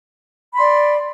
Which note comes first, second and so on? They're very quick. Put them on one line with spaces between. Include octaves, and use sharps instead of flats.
B5 C6 D5